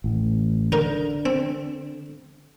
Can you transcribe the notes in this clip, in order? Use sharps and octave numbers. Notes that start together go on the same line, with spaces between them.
A1
D3 D#4 A#4
C4